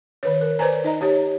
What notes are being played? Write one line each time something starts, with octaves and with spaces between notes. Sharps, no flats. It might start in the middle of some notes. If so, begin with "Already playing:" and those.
D#3 B4 C#5
A#4
B4 C5 D5 G#5 A#5
D#4 D#5 A#5
D#4 G4 C#5